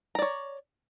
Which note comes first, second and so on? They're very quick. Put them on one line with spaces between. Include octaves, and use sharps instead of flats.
A#5 D5 C#5